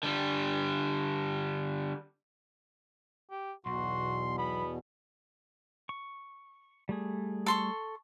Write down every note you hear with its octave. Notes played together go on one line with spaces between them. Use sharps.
D3 G3
G4
B1 E2 B2 F#4 C6
B3 B5
C#6
G3 A3 G#4
A4 C6 C#6